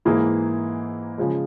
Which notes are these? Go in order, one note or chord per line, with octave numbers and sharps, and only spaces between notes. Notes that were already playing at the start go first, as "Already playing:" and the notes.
G#2 E3 A#3 E4 G#4
C#3 F3 G#3